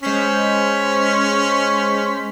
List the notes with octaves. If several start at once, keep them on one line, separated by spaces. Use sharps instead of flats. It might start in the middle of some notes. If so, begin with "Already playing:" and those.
G#3 C#4 C5 B6